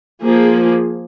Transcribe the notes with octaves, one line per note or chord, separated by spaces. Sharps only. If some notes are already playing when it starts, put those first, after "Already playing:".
F3 A#3 G#4